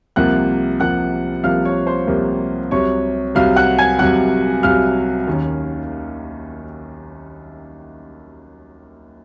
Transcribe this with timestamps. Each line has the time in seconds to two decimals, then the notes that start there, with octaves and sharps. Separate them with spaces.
0.16 C2 C3 F3 A#3 F#5 F#6
0.80 C2 C3 F3 A#3 F#5 F#6
1.44 C2 C3 F3 A#3 F5 F6
1.65 C#5 C#6
1.87 C5 C6
2.07 C2 C3 F3 A#3
2.71 C2 C3 F#3 C#5 C#6
3.35 C2 C3 F#3 F5 F6
3.56 F#5 F#6
3.78 G#5 G#6
3.99 C2 C3 F#3 F#5 F#6
4.63 C2 C3 F#3 F5 F6
5.27 D#2 D#3 A#3 C#4